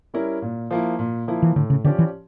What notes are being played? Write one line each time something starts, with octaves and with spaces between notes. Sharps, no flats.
G3 C#4 E4 A#4
A#2
F3 A#3 E4
A#2
F3 A#3 E4
E3
A2 D3
C#3
D3 F3 C#4 G4 D5
E3